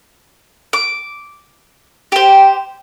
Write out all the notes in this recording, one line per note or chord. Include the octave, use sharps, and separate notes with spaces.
D6
G4 C5